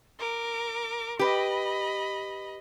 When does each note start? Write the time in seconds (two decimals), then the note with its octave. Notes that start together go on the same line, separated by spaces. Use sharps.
0.19 A#4 D6
1.19 G4 B4 D#5 B5